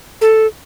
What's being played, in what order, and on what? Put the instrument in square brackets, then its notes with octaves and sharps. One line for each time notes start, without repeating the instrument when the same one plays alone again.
[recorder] A4